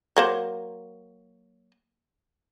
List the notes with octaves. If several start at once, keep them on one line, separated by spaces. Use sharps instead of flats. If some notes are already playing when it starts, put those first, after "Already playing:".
F#3 A#3 C5